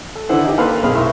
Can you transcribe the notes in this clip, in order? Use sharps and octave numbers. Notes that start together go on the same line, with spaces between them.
A4
D3 E3 E4 C5 F#5 E6
D#4 G4
A#3 A4 B4 F5 C6 F6
B1 B2 C4 G#4 B5 F6
A2 A#4 E5 C6 C#6